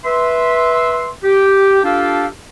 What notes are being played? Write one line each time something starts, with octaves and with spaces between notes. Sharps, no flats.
B4 E5 C6
G4
D4 F4 G4 A4 F5